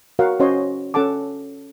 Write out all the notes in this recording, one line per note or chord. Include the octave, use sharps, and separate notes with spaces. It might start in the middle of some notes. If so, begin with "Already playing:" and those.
F#4 A#4 C#5 F5 F#5
C#4 F#4 C5 C#5 D#5 C6
C#4 A4 F#5 A5 D6